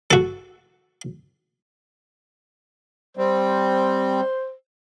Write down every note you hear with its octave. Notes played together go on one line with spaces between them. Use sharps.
F#4 A4
G3 C4 C5